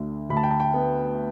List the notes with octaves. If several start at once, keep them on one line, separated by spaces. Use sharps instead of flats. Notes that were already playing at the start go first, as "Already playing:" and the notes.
Already playing: D2 D3
D2 B5
A5
G5
A5
G5
B3